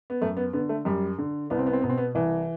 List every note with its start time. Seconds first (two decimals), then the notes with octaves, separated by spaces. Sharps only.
0.10 B3
0.22 F#2 A3
0.37 B3
0.53 D3 B3
0.69 A3
0.85 F#2 G3
1.19 D3
1.50 C2 B3
1.59 C4
1.67 B3
1.73 C4
1.82 B2 B3
1.89 C4
1.98 B3
2.15 C2 E3